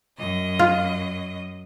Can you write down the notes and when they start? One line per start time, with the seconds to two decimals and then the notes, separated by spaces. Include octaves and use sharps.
0.18 F#2 D#5
0.59 F4